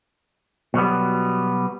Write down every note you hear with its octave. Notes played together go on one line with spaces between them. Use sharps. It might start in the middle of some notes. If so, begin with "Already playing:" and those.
B2 F#3 G3 B3